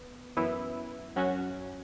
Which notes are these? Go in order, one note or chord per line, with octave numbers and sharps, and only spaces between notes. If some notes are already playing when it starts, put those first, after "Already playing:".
Already playing: B3
F#2 E3 B3 E4
F#2 F#3 C#4 F#4